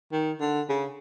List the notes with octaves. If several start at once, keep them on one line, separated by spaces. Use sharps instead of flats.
D#3
D3
C#3